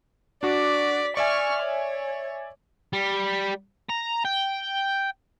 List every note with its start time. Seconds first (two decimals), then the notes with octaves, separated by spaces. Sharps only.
0.43 D4 F#4 D5 D6 B6
1.17 D5 E5 G#5 C#6 F6
1.63 C#5
2.93 G3
3.90 A#5
4.25 G5